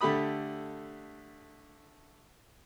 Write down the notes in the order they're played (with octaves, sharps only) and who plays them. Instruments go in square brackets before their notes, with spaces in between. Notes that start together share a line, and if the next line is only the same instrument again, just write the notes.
[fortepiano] D3 A3 G4 B5 D#6